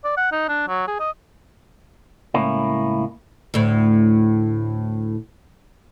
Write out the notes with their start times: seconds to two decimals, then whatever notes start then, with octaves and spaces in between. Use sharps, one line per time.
0.04 D5
0.17 F#5
0.32 D#4
0.48 D4
0.68 F#3
0.87 G#4
1.00 D#5
2.34 C#2 A2 A#3 C#4 E4
3.54 D2 A2